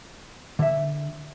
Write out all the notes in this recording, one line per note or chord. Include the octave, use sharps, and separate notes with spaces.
D3 E5